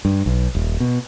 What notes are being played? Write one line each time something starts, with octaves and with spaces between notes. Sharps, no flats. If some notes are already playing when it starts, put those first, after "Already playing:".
G2
B1
D#1
B2